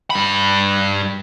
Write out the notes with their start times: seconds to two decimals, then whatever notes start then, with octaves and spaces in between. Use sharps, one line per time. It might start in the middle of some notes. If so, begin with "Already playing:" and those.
0.10 G2 B5